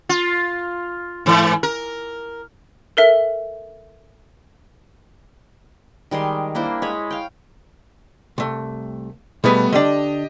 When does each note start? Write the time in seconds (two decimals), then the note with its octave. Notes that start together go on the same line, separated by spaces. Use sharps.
0.09 F4
1.26 G#2 E3
1.63 A#4
2.97 A4 A#4 E5
6.11 D#3 G3 G#3 C6
6.55 A#3 D4 E4 C5
6.82 G#3 C#5 B5
7.10 F5 G5
8.38 C2 A3
9.44 B2 G3 A3 B3 G#4 B4
9.73 D3 D4 G4 D#5